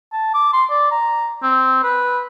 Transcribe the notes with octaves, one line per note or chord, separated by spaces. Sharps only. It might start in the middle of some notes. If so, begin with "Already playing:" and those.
A5
D6
C6
D5
A#5
C4
B4